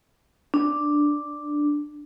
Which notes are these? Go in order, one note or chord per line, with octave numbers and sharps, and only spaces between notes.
D4